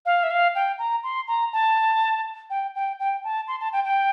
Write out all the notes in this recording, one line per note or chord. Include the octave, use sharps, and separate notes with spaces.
F5
E5
F5
G5
A#5
C6
A#5
A5
G5
G5
G5
A5
C6
A5
G5
G5